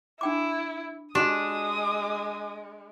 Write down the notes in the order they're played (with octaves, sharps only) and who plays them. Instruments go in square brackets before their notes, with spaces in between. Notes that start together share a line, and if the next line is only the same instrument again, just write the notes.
[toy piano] D4 G5 D6 [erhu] E4
[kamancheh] G#3 [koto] D4 [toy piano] F#4 G4 [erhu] D#6